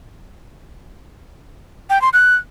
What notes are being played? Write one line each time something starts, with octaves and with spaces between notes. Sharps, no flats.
G5
C6
F#6